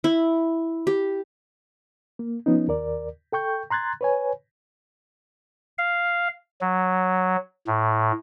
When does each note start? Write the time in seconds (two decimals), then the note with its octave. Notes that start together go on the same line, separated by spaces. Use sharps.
0.04 E4
0.87 G4
2.19 A#3
2.46 F3 B3 C#4 D#4
2.68 D#2 A#4 D5
3.32 A4 G5 C#6 G6
3.70 A#5 C6 F#6 G#6 A6
4.01 B4 C#5 G#5
5.78 F5
6.61 F#3
7.67 A2